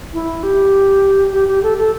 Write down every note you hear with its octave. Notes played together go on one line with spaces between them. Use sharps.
E4
G4
G4
G4
A4
A4